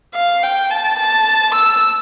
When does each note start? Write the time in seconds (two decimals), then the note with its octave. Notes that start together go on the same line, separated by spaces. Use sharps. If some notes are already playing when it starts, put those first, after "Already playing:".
0.15 F5
0.43 G5
0.71 A5
0.99 A5
1.55 E6